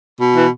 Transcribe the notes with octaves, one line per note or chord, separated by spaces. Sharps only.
B2
E3